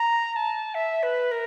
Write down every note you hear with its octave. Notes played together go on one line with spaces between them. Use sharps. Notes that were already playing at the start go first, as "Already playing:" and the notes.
Already playing: A#5
A#5
A5
E5
B4
A#4